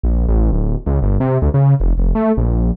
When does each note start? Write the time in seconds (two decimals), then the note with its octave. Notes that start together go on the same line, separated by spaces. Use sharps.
0.03 A#1
0.28 A1
0.53 D1
0.86 C#2
1.02 G1
1.20 C3
1.42 D2
1.54 C#3
1.80 F1
1.98 F1
2.15 A3
2.37 A#1